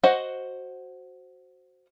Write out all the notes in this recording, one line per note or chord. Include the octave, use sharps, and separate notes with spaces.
F#4 C5 D#5 F#5